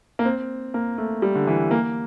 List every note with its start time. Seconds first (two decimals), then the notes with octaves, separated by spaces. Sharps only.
0.19 A#3
0.25 C4
0.74 A#3
0.98 A3
1.22 G3
1.35 D3
1.47 E3
1.71 A#3